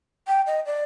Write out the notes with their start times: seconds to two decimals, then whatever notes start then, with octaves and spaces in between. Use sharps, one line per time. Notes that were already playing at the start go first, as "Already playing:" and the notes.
0.28 G5
0.47 D#5
0.66 D5